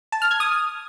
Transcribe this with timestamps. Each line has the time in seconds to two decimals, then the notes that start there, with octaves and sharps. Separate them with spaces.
0.12 A5
0.22 F6
0.31 G#6
0.40 D#6